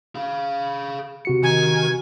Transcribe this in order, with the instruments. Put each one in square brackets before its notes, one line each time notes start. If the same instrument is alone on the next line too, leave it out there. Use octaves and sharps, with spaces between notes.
[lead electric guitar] G#4 F5
[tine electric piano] C3 F#4 C#7
[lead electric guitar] D#3 [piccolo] G#5